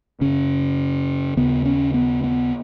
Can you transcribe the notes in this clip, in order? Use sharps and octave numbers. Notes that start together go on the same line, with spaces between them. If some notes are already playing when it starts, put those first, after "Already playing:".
F#2 C#3 C#4
D#2 C#3 B3
C#4
B3
B3